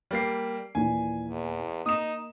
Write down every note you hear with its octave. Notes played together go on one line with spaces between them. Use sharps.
G3 A#3 C7
D#2 A#2 E3 G#5
E2
A#3 D#4 D#6 E7